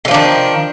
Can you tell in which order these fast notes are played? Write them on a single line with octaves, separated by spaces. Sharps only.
D3 F3 D4 D#3